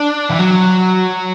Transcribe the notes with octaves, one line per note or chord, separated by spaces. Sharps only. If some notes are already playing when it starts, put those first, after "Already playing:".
Already playing: D4
E3
F#3